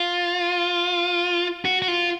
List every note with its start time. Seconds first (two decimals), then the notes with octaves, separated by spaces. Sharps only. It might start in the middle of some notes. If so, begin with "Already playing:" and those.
Already playing: F4
1.65 F#4
1.82 F#4
1.88 F4